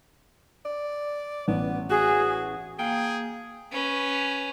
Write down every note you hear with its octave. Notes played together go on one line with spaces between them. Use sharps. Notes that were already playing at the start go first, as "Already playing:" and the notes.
D5
A1 B3
F#4 G#4
A#3 F4 G#4 G5 A5
C#4 B4